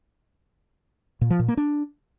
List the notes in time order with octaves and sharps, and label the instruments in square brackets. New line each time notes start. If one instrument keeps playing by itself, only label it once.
[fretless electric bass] A#2
F3
A#2
A#3
D4